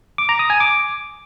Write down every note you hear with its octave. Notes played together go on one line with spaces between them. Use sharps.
D6
A#5
D#6
G#5
D6